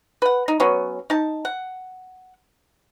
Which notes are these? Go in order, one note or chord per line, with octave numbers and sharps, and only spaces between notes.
B4 F#5
D#4
F#3 B3 C#4
D#4 A5
F#5